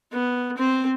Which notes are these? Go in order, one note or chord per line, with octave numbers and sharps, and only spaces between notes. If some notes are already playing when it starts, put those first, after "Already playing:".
B3
C4 C5